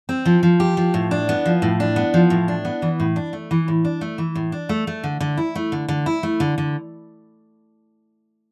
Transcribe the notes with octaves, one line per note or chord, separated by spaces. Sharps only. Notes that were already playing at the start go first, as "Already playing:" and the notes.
C4
F3
F3
G4
F3
A2
D4
B3
F3
A2
D4
B3
F3
A2
D4
B3
E3
A2
D4
A3
E3
A2
D4
A3
E3
A2
D4
A3
A3
D3
D3
E4
A3
D3
D3
E4
A3
D3
D3